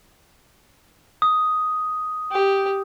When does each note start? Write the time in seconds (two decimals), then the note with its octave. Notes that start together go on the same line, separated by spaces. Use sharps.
1.22 D#6
2.31 G4